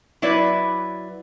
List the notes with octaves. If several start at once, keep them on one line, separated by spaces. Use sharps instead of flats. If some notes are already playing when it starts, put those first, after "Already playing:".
F#3 E4 B4 D5